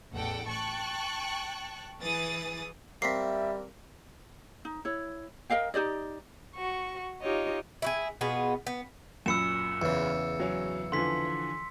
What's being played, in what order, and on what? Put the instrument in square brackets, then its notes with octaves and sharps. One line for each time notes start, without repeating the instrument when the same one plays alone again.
[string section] A1 E2 A4 F#5 G5
G5 A5 C#6 F#6
E3 G#4 B4 D#6 A6
[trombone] G3 [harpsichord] A#3 C4 [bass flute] E5 [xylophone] B6 C7
[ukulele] D#4
E4 C#5
A#4 D#5 F5 G5
D#4 G4 D5 D#5
[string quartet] F#4 C#6
D#4 F4 G4 C#5 D#5
[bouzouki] E4 F#4 G#4
B2 B3 F4 G#4
B3
[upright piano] F#2 A#2 B5 [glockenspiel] E6 C#7 E7
[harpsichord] E2 C#3
[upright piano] F#3 C#4
[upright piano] D3 E3 F3 [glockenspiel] C6 B6